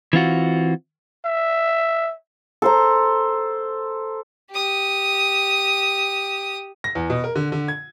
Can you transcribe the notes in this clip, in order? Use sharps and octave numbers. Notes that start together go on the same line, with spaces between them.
E3 C4 F4 F#4
E5
A4 C5 A#5
G4 D#6
A#6
E2
B2
A#4
D3
D3
G#6